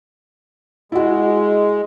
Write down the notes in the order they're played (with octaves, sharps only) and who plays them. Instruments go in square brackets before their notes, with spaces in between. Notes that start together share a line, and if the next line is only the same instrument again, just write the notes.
[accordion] G#3 [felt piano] E4 F#4